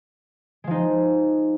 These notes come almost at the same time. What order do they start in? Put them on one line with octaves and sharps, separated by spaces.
G#3 F3 D#4